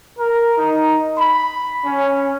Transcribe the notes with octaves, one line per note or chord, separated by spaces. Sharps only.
A#4
D#4
B5
C#4